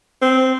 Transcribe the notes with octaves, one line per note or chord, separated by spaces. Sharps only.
C4